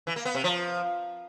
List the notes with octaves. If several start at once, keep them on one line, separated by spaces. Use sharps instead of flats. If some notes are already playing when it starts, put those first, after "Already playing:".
E3
A#3
B3
C3
F3